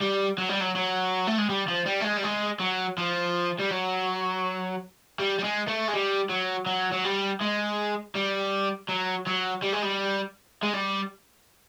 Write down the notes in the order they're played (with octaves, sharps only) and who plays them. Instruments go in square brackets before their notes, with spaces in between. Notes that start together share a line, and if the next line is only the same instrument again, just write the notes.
[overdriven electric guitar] G3
F#3
G3
F#3
F#3
A3
G#3
G3
F3
G3
A3
G#3
G3
G#3
F#3
F3
G3
F#3
G3
G3
G#3
A3
G#3
G3
F#3
F#3
F#3
G3
G#3
G3
F#3
F#3
G3
G#3
G3
G#3
G3